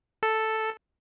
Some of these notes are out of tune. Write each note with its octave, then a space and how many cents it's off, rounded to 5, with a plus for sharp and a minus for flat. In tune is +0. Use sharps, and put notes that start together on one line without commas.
A4 +0